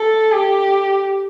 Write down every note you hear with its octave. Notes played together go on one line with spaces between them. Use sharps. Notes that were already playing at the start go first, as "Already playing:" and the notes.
Already playing: A4
G4